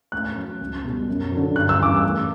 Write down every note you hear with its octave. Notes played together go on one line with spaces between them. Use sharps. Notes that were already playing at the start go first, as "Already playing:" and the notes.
A2 F#6
F#3
C#2
B2 G3
F#2
D3 F#3
G2 F#6
E6
E3 G3 D6
E6
A2